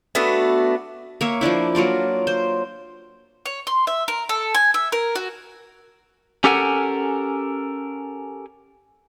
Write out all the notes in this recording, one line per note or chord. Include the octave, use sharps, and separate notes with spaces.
A3 B3 D4 F#4
A#3 C#5 E5
F3 A#3 D4 E4
F#3 A#3 F4 D5
C5
C#5
C6
E5
A#4
A4
G#5
E5
A#4
F#4
C#4 G4 A4 A#4 F#5 G#5